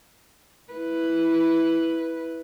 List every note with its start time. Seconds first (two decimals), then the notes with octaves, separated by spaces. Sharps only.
0.73 E4 B4